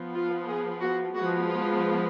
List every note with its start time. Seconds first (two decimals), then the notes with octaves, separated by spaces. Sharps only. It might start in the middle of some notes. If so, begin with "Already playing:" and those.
Already playing: F3 B3
0.14 F4
0.47 G#4
0.81 F#4
1.15 F3 G#3 B3 F#4
1.48 F4